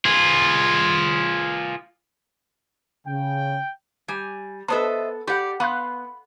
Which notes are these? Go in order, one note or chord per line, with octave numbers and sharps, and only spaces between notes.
F4 G#4
C#3 G5
G3 G#5
B3 A4 B4 C5 D#5 E5 A5
G4 D5 F#5 B5
B3 F5 B5 C6 F#6